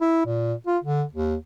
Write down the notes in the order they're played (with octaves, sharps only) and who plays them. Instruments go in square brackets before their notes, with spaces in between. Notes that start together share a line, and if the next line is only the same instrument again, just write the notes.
[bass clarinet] E4
A#2
F4
D3
D#2